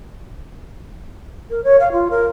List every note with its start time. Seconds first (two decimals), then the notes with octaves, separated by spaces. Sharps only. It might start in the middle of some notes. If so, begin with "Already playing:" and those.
1.50 A#4
1.64 C#5
1.80 F5
1.92 F4
2.10 A#4